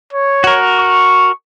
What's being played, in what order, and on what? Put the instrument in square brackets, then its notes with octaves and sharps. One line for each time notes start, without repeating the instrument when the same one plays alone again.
[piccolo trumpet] C#5
[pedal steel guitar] F#4 A#4
[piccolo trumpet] C#6